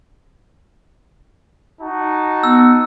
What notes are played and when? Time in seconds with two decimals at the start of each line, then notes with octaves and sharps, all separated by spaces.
1.80 D#4 F#4 A5
2.44 B3 E6